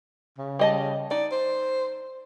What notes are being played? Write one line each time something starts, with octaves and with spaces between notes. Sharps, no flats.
C#3
G3 D#5 A5
D#4 D5
C5